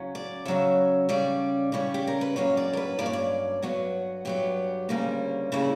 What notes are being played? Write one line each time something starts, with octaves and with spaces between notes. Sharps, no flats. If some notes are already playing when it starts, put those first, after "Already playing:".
Already playing: C#3 F#3 C#4
D5
C#3 F#3 C#4 E5
C#3 G3 C#4 D5
C#3 G3 C#4
G4
A#4
B4
G2 F#3 A#3 C#4 C#5
D5
A#4
B4
G2 F#3 A#3 C#4 D5
C#5
D5
G2 F#3 B3 F#4
G2 F#3 B3 G4
D2 C#3 G3 A#3 C#4
C#3 G3 A#3 C#4 E4